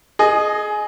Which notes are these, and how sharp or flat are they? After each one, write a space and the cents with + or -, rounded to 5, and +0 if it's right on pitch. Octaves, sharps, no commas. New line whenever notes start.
G#4 +20 D#5 -10